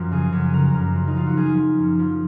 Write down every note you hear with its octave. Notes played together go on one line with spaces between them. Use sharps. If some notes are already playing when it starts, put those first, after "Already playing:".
Already playing: F#2 F3 A#4
C#3 G#4
F#2
C#3 A#4
F#2
F3
D#4
F3 F4
F#4
F3 G#4
F3
F#2
F3